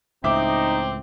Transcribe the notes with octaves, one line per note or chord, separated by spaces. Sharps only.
C#2 A2 C4 D#4 E5 D6